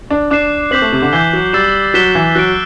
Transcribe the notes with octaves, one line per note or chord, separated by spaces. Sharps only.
D4
D4 D6 F#6 C7 E7
C4 D6 G6 B6 F#7
A3
C3
D3
E3 G6 C7 G7
F#3
G3 E6 A6 C7 E7
F#3 F#6 B6 E7 G7
E3
F#3 F#6 B6 D7